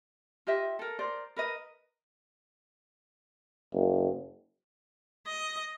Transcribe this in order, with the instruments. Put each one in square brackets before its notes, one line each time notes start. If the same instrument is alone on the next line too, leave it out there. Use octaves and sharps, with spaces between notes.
[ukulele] F4 G4 D#5 E5
A4 A#4
A#4 C5 D5
A#4 B4 D#5
[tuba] F#1
[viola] D#5